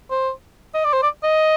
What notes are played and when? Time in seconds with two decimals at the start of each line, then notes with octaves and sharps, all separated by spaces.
0.11 C5
0.74 D#5
0.85 D5
0.93 C5
1.03 D5
1.24 D#5